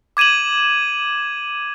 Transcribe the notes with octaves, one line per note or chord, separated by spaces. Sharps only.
D6 G#6 D#7 E7 F#7